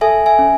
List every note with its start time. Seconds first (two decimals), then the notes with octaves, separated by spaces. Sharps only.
0.01 A4 E5 G#5
0.26 E5 G#5
0.39 C#4